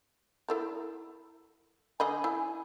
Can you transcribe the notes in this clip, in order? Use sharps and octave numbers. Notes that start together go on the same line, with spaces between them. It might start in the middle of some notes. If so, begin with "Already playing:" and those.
E4 A4 A#4
D3 D#5 G#5 B5
E4